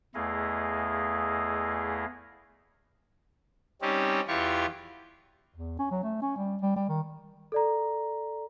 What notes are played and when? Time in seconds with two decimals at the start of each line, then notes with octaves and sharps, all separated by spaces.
0.15 E2 A3 E4 G#4 D#5 F5
3.82 G3 C4 C#4 D#4 G4
4.28 E2 E3 F4 G4 C#6
5.54 E2
5.79 C#4
5.91 F#3
6.03 A3
6.22 C#4
6.37 G3
6.62 G3
6.76 G3
6.89 D#3
7.52 A4 D5 A#5